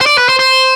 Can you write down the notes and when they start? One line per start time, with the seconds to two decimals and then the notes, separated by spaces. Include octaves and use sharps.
0.01 C5
0.06 D5
0.18 B4
0.29 C5
0.39 C5